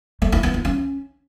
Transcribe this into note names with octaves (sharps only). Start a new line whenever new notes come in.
A3
E4
B3
F4
C#4